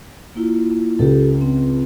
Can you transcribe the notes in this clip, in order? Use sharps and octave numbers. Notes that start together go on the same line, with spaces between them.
A#3 E4 F4
C#2 G4 A4
C4